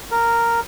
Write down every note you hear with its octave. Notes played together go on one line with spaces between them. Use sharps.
A#4